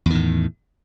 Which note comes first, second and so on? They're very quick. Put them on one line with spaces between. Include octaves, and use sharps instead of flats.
E2 D#3 A2